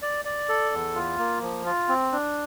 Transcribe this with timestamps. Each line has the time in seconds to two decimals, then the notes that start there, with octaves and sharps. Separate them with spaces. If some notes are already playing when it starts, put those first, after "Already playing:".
0.02 D5
0.25 D5
0.49 A4
0.72 E2
0.95 F4
1.19 A#3
1.42 F3
1.65 F4
1.89 C4
2.12 D4